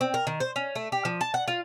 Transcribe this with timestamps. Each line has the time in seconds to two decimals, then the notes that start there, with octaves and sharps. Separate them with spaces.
0.01 C4
0.14 A#4
0.27 D#3
0.40 C5
0.56 C#4
0.75 A3
0.92 G4
1.05 F3
1.21 A5
1.34 F#5
1.48 F4